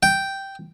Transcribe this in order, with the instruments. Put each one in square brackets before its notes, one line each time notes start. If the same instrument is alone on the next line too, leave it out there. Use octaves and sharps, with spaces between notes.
[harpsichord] G5